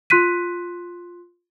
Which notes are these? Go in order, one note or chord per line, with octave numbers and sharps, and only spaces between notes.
F4 C6 F#6 B6 D#7